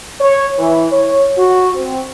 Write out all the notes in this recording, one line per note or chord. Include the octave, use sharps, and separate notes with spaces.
C#5
E3
C#5
F#4
C4